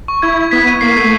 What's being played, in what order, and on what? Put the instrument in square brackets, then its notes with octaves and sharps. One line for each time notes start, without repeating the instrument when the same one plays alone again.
[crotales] C#6
[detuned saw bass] E4 [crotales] G#6
[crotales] G#6
[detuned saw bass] B3 [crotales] B6
[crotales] D#7
[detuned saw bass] A#3 [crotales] C7
[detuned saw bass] A3 [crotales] C7